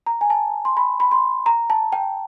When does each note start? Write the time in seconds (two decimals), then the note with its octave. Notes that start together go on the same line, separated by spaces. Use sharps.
0.06 A#5
0.21 G#5
0.30 A5
0.65 C6
0.77 B5
1.00 B5
1.11 C6
1.46 A#5
1.70 A5
1.92 G5